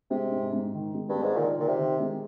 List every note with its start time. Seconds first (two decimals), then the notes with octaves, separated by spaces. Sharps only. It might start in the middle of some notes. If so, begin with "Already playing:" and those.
0.10 C3 G#3
0.31 G#2
0.53 G#2
0.73 D#3
0.94 G#3
1.09 G2
1.15 G#3
1.23 G#2
1.37 A#2 D#3
1.58 A#2 D#3
1.68 C3
1.78 D#3
2.00 G#3